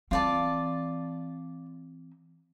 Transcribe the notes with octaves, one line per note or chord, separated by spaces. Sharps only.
E3 C4 F4 D5 A5